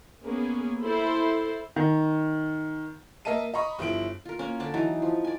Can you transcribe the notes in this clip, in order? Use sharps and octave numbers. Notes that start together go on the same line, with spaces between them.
A#3 B3 C#4 G#4
E4 A4 C5 B5 C6
D#3
A#3 A#4 D#5 E5 A5 D#7
D#5 A#5 B5 C#6 D#6
G1 F3 E4 D7 F#7
F4 A#4
A#3 C#4
D3 D4 D5 A5
E3 F#3 D#4
F3
D5 G#5